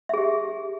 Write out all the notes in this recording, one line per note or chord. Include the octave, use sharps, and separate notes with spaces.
G4 G#4 E5